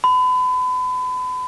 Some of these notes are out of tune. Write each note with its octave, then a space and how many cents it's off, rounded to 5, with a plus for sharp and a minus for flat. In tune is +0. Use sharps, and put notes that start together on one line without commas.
B5 +35